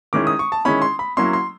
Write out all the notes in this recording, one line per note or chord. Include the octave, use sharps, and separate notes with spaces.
D#3 G#3 C#4 E4 D6
D#6
C#6
A5
D#3 G#3 C#4 E4 B5
C6
B5
F#3 A#3 C#4 E4 C6
C6